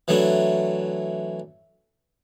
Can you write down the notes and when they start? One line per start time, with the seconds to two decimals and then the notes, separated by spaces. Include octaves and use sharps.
0.08 E3 F#3 A3 D4